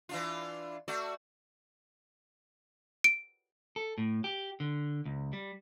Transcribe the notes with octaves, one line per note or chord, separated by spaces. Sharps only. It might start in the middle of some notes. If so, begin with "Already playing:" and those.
E3 D4 F4
A3 F#4 D5
D7
A4
A2
G4
D3
C#2
G3